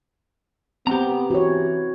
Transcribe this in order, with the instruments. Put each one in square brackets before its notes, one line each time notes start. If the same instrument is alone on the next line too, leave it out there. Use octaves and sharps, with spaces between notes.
[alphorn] B3 [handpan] C4 [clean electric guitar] G4 A#5
[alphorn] E3 [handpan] F#4 C#5